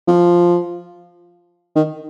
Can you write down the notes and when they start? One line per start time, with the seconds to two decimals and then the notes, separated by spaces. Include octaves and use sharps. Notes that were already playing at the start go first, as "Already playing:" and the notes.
0.08 F3
1.76 D#3